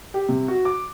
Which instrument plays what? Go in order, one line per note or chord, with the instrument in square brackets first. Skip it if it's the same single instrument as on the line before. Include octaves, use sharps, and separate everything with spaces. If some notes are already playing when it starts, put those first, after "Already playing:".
[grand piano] G4
C3
F#4
D6